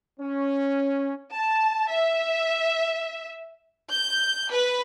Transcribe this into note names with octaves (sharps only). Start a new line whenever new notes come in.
C#4
A5
E5
G6
B4